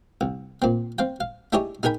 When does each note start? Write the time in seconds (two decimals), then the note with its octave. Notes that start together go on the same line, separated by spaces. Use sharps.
0.21 C2
0.62 A#2 C4
0.98 C4 F5 G5
1.20 F5
1.53 D4 E4 G4 G#4 C#5 D#5
1.83 D#4 G#4 A#4 G5 B5